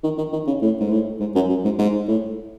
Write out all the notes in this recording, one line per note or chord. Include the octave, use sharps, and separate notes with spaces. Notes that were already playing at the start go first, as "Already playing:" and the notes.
D#3
D#3
D#3
C#3
A2
G#2
A2
G#2
F#2
F#2
G#2
G#2
A2